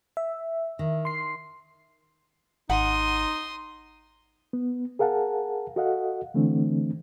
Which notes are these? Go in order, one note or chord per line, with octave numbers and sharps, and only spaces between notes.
E5
D#3
C6 C7
G#1 D#4 F#5 C6 D#6
B3
G#4 A#4 F5 F#5 A5
F#4 A4 D#5 F5 F#5
D3 E3 A3 C4 D4